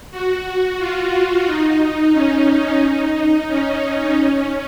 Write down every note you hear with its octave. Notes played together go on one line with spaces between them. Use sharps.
F#4
F4
F4
D#4
C#4
D#4
C#4
C#4